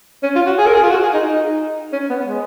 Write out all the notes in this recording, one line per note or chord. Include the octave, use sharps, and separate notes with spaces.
C#4
F4
F#4
G#4
A#4
G#4
F4
F#4
G#4
D#4
D#4
C#4
B3
G#3